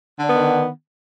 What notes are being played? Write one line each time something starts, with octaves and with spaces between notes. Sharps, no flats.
D3 D#3 B3 D4